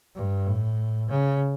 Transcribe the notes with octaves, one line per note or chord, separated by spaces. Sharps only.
G2
A2
C#3